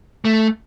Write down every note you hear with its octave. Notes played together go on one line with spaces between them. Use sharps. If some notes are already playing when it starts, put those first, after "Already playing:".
A3